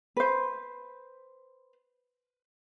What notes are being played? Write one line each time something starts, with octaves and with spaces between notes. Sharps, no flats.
B4 C5